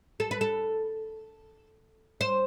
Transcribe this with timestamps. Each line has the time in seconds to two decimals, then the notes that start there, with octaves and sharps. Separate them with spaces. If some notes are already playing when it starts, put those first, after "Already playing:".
0.20 A4
0.31 B4
0.41 A4
2.21 C5